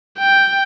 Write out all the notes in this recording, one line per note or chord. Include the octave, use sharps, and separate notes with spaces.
G5